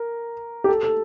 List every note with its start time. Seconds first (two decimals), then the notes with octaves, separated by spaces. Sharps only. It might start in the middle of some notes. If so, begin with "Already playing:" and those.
Already playing: A#4
0.64 G4
0.68 A4
0.83 A4